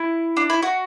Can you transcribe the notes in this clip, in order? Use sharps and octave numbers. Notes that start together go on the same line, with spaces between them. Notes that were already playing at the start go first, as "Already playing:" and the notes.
Already playing: E4
D4
E4
F#4